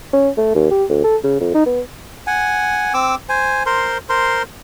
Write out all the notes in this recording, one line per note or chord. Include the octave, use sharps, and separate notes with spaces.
C#4
A3
D#2
G4
D2
A4
C#3
F2
D#4
B3
F#5 G#5
C4 D6 E6
C5 G#5
A#4 C5 C6
A#4 C5 C6